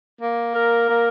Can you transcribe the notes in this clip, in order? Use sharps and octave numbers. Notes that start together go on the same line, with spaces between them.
A#3
A#4
A#3